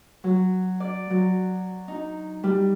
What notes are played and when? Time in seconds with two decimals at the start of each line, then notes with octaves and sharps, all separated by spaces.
0.24 F#3
0.80 D5
1.10 F#3
1.88 D#4
2.43 G3